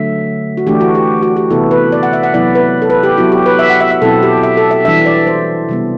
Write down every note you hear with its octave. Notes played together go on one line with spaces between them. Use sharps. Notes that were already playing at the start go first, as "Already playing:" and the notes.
Already playing: D3 F#3 A3 E5
F#4
E3 A3 D4 G4
F#4
G4
F#4
G4
C3 E3 B3 E4 A4
B4
D5
F#5
E5
F#5
C3 F#3 B3 E4 D5
B4
A4
B4
G4
F#3 B3 E4 F#4
G4
B4
E5
F#5
E5
E5
B2 F#3 C4 E4 A4
G4
E5
A4
E5
E3 G3 D4 E5
D5
C5
C3 G3 B3